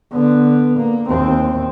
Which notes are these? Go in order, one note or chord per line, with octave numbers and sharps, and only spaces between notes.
D3 B3
A#3
D#2 C4